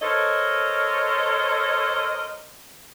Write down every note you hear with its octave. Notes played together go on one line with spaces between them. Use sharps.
A4 A#4 C5 C#5 D#5